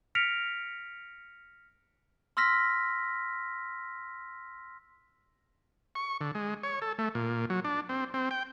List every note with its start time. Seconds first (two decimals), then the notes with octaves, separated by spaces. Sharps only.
0.15 F6 A#6 B6 C#7 D7 F7
2.37 C6 E6 F6 A#6 B6
5.95 C#6
6.21 D3
6.35 G#3
6.63 C#5
6.82 A4
6.99 A3
7.15 A#2
7.50 F#3
7.65 D4
7.89 C4
8.14 C4
8.31 G5